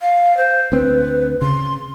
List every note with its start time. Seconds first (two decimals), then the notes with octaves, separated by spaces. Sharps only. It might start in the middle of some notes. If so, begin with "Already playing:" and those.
0.01 F5
0.37 C5
0.72 D2 C4 B4
1.42 C#3 C6